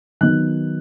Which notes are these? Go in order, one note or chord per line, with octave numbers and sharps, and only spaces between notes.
D#3 F#3 B3 D#4 F#6